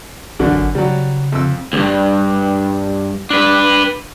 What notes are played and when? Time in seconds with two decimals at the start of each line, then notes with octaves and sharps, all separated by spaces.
0.39 A#1 F#2 D3
0.57 G#1
0.75 C#3 F#3 G3
1.32 F2 E6
1.73 D2 G2
3.30 D4 B4